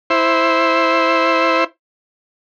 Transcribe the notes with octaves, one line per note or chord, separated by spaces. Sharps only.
E4 C5